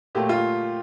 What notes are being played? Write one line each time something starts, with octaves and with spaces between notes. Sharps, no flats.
A#2 F#3 A3 G4
F4